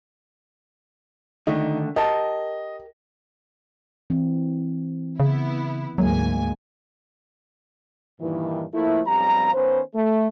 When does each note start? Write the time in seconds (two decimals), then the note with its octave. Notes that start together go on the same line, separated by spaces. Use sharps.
1.47 D3 D#3 A3 D#4
1.96 G4 A#4 D#5 A5
4.10 E3 C4
5.20 C#3 B3 E4
5.98 D2 G#2 F#3 G#3 A#3 G#5
8.21 G2 A#2 D#3 E3
8.74 F3 A3 A#3 E4
9.07 B1 G2 F3 G3 C4 A#5
9.54 D#3 B3 C#4 B4 C5
9.95 A3